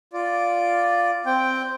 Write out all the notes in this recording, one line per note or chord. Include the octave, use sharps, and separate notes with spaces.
F4 D5
C4 G5